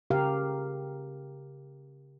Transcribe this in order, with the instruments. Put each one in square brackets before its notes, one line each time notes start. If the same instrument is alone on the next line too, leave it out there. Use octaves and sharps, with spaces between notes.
[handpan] C#3 G4 A#4 F5